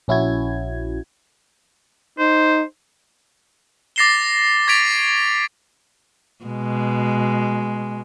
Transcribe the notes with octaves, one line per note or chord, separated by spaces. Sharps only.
A#1 C#4 E4 F#4 G#6
D#4 C5
D6 A6 A#6 C7 E7 G7
C#6 G#6 A6 B6 D7 F7
B2 G#3